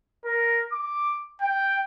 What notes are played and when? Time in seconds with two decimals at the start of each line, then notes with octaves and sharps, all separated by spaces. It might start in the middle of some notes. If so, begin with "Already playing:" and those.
0.25 A#4
0.72 D6
1.41 G5